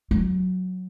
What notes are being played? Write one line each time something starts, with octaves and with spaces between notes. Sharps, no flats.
F#3